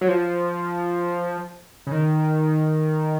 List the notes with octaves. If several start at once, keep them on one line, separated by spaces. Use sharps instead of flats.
F#3
F3
C#3
D#3